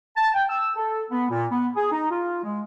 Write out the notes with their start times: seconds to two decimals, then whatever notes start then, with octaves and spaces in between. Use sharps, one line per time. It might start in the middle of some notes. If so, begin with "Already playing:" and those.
0.16 A5
0.34 G5
0.50 E6
0.76 A4
1.10 B3
1.30 A#2
1.51 B3
1.76 G#4
1.92 D#4
2.11 F4
2.43 G#3